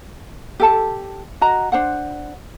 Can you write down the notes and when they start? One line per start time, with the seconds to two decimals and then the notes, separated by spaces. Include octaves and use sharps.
0.60 G4 A4 A5
1.41 F#4 D#5 A#5
1.72 D4 C5 F#5